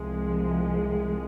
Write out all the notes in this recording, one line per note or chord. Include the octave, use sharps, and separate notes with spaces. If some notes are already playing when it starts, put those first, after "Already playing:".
Already playing: C2 C3 F3 G#3